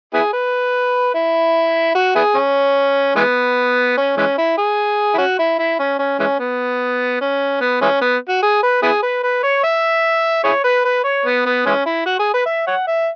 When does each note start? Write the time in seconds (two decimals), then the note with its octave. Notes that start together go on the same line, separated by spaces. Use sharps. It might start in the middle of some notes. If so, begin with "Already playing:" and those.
0.13 B3 E4 G#4
0.33 B4
1.14 E4
1.95 F#4
2.15 B3 E4 G#4
2.35 C#4
3.16 E3 G#3 B3
3.97 C#4
4.17 E3 G#3 C#4
4.38 E4
4.58 G#4
5.14 E4
5.18 C#4 F#4
5.39 E4
5.59 E4
5.79 C#4
5.99 C#4
6.19 E3 G#3 C#4
6.39 B3
7.21 C#4
7.61 B3
7.81 E3 G#3 C#4
8.01 B3
8.28 F#4
8.42 G#4
8.63 B4
8.82 B3 E4 G#4
9.02 B4
9.23 B4
9.43 C#5
9.64 E5
10.44 E4 G#4 C#5
10.64 B4
10.85 B4
11.04 C#5
11.25 B3
11.46 B3
11.66 E3 G#3 C#4
11.86 E4
12.06 F#4
12.19 G#4
12.33 B4
12.46 E5
12.67 C#5 F#5
12.87 E5